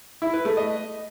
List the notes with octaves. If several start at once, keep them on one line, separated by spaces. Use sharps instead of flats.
E4
B4
A3
D#5